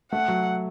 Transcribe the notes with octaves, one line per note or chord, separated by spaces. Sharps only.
A3 F#5
F#3